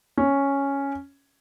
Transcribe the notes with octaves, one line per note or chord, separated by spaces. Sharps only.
C#4